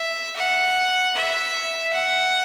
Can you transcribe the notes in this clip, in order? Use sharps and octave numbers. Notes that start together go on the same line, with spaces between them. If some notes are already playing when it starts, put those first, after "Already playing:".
Already playing: E5
F#5
E5
F#5